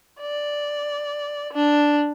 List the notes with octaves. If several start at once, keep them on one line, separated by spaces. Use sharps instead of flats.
D5
D4